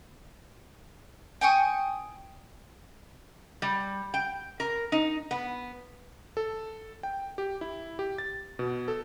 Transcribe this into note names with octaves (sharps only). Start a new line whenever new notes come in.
G5 G#5 C#6 D#6
G3
G5
A#4
D#4
B3
A4
G5
G4
E4
G4
A6
B2
A4